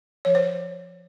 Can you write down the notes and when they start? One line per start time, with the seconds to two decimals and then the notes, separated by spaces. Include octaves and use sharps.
0.25 F3 C#5
0.35 C5